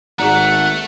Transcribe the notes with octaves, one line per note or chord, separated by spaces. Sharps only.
G#1 A3 G#4 D5 F#5 A#5